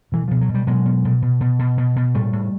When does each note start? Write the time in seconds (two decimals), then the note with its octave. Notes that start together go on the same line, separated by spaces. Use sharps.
0.12 B2 E3
0.28 B2 F3
0.41 F#3
0.49 B2
0.54 G3
0.67 B2 F#3 G#3
0.86 B2
1.05 B2
1.22 B2
1.40 B2
1.59 B2
1.77 B2
1.96 B2
2.15 A2 G3 A3
2.33 A2